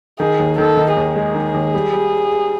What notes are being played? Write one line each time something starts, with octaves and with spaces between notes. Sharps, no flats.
D#3 G#4
D#2
D#3 A4
D#3
D#2 G#4
G#3
D#3
D#2
G3
G3